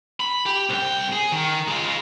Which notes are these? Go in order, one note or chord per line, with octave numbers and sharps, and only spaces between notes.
B5
G4
C2 G5
G#4
D#3
G#3 F4